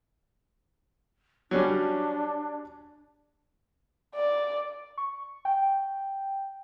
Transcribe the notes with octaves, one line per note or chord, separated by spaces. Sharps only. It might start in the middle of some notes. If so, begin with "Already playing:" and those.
F#3 G3 C#4 D4
D5
C#6
G5